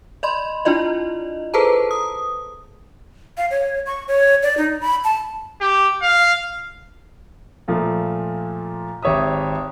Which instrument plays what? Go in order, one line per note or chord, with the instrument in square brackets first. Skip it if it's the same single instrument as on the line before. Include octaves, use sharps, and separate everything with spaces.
[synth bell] D5 D#5 B5 C6
D4 E4 F4 D5 D#5
G#4 A4 B4 C5 A5 A#5
D#6
[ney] F5
C#5
C#6
C#5
D5
D#4
B5
A5
[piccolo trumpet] G4
F5
[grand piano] A#2 F3 A3
G#1 G4 C#5 E5 D#6